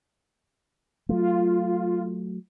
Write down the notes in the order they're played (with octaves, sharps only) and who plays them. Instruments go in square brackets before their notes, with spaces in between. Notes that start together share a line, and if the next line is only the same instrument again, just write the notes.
[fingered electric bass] F#3 A3 [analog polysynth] F4